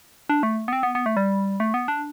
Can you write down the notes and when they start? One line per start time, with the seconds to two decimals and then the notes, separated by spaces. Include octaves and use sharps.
0.29 D4
0.43 A3
0.68 B3
0.73 C4
0.83 B3
0.95 B3
1.06 A3
1.17 G3
1.60 A3
1.74 B3
1.88 D4